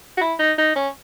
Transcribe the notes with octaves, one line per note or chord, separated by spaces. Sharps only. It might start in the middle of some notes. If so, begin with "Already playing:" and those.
F#4
E4
D#4
D#4
C#4